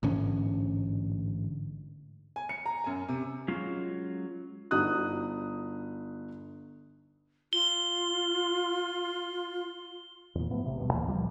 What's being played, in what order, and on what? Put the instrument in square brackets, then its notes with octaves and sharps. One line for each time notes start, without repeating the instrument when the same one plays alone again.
[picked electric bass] A1 G#2 D3 C#4
[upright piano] G#5
C#7
A#5
F#2 G#5
C3
[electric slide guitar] F#3 G#3 C#4 F4
[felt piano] G1 D#4 F#4 D#6 F#6
[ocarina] F4 [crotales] G7
[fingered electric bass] E2 A#2
G#2 F3 A3 B3
A1 C3
D1 G2 B2
D2 A#2 E3
C#2 A#2 F3 G3